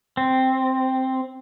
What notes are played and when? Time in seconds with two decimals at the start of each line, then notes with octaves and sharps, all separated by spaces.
0.17 C4